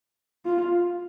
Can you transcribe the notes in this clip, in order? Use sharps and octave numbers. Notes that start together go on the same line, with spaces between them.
F4